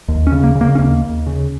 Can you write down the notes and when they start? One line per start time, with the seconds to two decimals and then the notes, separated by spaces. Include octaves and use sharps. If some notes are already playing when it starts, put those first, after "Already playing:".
0.08 D#2
0.27 C#4
0.32 C#3
0.44 A#3
0.55 C#3
0.61 A#3
0.75 C#4
0.79 D#2 A#3
1.03 D#2
1.27 C#3